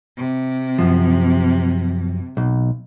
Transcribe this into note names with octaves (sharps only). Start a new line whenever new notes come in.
C3
F#2 F3
B1